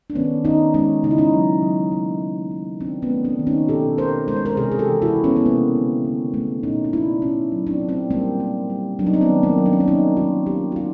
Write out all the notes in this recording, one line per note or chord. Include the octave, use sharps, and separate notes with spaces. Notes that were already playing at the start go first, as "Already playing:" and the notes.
D4
D#3 B3 C#4
D#3 C#4 D#4
G#3 C#4 D#4
C#3 D#4
E4
C#4 D#4
F#3
F#3
A#3
A#3
A#3
D#3 C4 D4
B3 C#4
A3
C4 D4
D#3
C#4 D#4
B2 G4 A4
B2 A#4 C5
G#3 C5
C#5
A#4 C5
C3 G#4 A#4
G#4
G4 A4
E3
E4 F#4
C3
B3 C#4
B3
G#3 A#3 C4
D3
D3
A3 B3 C#4
A#2 C#4 D#4
D#4
A#2 D4 E4
B2 C#4 D#4
F#3
C4 D4
F#3
C4 D4
G3 A#3 C4
A#3
G3
F#3 D4
D#4
C4 D4
B3 C#4
D#3
A#3 C4
F#3
D4
C#4
C4 D4
A#3 C#4 D#4
F#3 D#4 F4
A#3 F4 G4
F#4
D3 D#4 F4